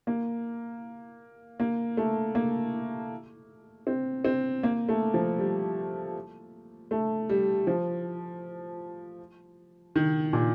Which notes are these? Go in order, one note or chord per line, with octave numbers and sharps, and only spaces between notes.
A#3
A#3
A3
A#3
C4
C4
A#3
A3
F3
G3
A3
G3
F3
D#3
A#2